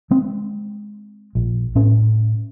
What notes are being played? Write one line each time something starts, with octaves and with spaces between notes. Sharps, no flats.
G#3 C4
A#1
A2 C#4